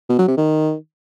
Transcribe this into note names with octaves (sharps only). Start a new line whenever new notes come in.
B2
F#3
C3
D#3